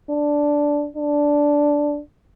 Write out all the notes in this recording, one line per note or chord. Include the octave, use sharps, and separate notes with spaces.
D4
D4